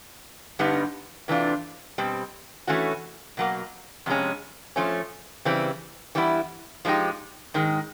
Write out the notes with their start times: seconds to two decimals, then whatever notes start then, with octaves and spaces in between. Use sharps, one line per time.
0.59 G2 D3 G3 B3 D#4
1.28 C3 E3 A3 D4 F4
1.98 B2 G3 C4
2.67 E3 A3 C#4 F#4
3.37 B2 F#3 A#3
4.06 F2 C3 G#3 C#4
4.76 F3 A3 C#4
5.45 C#3 E3 G3 C4
6.15 E3 G3 B3 E4
6.85 F3 G#3 C4 D#4 G4
7.54 G#2 D#3 G#3